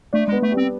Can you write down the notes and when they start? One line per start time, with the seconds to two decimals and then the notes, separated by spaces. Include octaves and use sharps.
0.13 A3 D4
0.28 G#3 B3
0.42 A3
0.52 G3 C4